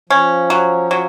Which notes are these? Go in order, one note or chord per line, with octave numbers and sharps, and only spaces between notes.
F3 C#4
F#3
F#3